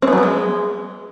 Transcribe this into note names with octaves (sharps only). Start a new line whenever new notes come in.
C4
B3
F#3
B3
G#3